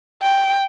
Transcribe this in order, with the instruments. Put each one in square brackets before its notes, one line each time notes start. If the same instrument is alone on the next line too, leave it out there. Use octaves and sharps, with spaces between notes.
[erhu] G5